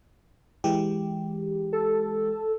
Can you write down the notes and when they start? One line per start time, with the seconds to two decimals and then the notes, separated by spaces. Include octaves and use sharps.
0.64 E3 G#3 G4
1.73 A4